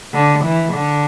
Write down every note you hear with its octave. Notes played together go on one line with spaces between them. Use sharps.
D3
E3
D3